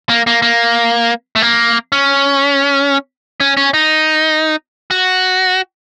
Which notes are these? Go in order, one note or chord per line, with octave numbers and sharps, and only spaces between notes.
A#3
A#3
A#3
A3
A#3
C#4
C#4
C#4
D#4
F#4